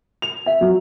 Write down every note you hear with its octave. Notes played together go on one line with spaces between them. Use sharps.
F7
E5
F#3